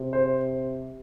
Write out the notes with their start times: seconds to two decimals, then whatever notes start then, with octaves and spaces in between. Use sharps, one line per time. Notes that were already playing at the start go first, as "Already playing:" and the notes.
Already playing: C3
0.13 C5